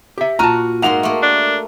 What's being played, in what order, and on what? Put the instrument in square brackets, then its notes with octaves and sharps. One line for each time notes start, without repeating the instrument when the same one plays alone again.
[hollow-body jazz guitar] G4 E5
[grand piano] A#2 F6 D#7 [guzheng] F#4 [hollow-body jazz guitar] A5 A#5
[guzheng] G#2 A#3 C6 [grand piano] F#5 F7
[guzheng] A3 A#3
[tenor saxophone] D4